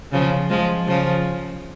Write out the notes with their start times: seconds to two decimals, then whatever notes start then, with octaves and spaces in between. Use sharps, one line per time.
0.12 C#3 F3
0.50 F3 G#3
0.87 C#3 F3